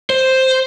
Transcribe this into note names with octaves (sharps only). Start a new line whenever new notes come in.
C5